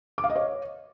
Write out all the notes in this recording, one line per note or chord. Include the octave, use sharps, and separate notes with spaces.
D6
F5
D#5
C#5